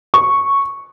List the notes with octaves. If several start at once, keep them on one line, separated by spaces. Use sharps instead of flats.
C#6